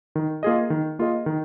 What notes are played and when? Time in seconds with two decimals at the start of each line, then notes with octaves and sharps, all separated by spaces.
0.15 D#3
0.43 A#3 F4 G#4 D#5
0.70 D#3
0.99 A#3 F4 G#4 D#5
1.26 D#3